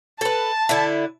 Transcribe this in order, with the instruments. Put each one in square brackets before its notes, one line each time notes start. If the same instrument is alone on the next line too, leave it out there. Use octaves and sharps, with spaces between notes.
[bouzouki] A4 B4 [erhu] A5
[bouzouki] D3 E4